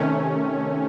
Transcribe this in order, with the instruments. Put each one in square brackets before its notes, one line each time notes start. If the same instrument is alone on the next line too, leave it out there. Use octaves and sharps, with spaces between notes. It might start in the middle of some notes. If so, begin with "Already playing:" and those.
Already playing: [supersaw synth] C3 D#3 A3 C#4